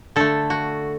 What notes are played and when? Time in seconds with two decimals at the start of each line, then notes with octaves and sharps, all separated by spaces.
0.16 D3 A3 A4
0.50 F#4